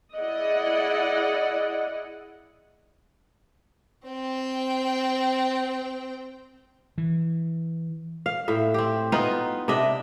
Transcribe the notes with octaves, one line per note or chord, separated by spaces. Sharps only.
E4 G#4 D5 D#5 F#5
C4 G5
E3
F5
A2 E5
C4 G4
B3 D#4 F4 B4
C3 D4 D#5 E5